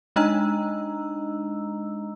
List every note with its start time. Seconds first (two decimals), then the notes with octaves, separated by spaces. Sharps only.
0.16 G#3 D4 D#4 D#5 A#5 E6